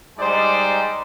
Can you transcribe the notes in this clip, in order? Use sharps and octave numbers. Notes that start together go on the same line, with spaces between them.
G3 G#3 D#4 C5 D5